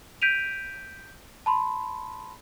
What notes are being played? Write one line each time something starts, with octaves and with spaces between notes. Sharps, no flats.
G6 B6 D7 D#7 F7
A5 B5 C6